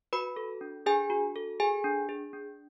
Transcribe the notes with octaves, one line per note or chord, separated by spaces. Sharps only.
F#4 B4 B5
A4
D4
D4 G#4 G#5
F#4
A4
G#4 G#5
D4
G#4
D4